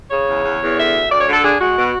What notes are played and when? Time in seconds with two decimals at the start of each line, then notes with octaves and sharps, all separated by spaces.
0.10 C#3 C#5
0.28 E2
0.43 E2
0.61 E2
0.76 D3 E5
0.93 D2
1.09 D2 D5
1.21 C#5
1.26 D3
1.32 A4
1.43 D4 G#4
1.60 G#3 F#4
1.76 B2